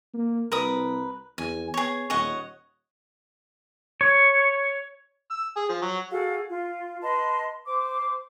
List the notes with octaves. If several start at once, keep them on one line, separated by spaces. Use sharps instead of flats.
A#3
C2 A#4 B4 D#6
E2 G#5
B3 G#4 C#5
D#1 C#5 D#5 F#5
C#5
E6
G#4
F3
F#3
F#4 G#4 A4 F5
F4
B4 D#5 A5 C6
C5 D6